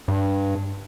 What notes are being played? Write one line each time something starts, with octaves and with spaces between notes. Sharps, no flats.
G2